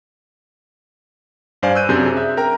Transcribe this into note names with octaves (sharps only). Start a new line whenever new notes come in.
G2 C5 D5 F5 G#5
E6 F#6 G6 D#7
F#2 C3 C4 D4 G#4 G6
E5
A#4 G5 A#5